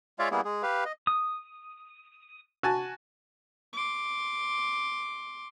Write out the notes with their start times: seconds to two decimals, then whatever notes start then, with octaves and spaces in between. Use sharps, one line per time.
0.19 G#3 F4 C#5 D5 E5 F5
0.31 G3 A#3 B3 E4 G#4
0.45 G#3 G#4
0.63 G4 B4 F5
0.85 D#5
1.07 D#6
2.63 F#4 G#5 A5
3.73 C6 D6